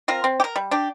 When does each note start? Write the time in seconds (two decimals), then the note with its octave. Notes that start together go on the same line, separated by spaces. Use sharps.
0.08 C4 F4 A#4
0.24 C4
0.40 G4
0.44 A#4
0.56 G3
0.71 D4 G4